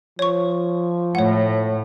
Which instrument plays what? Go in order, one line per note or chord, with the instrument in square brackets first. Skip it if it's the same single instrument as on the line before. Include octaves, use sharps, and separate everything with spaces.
[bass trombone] F3 [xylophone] C#5 C#6
[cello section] A2 [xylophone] C#5 F#5